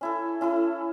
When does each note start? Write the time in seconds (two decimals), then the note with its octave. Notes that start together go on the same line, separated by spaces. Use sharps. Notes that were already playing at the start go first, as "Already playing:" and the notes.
0.01 C#4 E4 A4
0.41 C#4 E4 A4